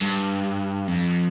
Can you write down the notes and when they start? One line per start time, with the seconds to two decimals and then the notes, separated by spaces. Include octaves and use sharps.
0.01 G2
0.87 F2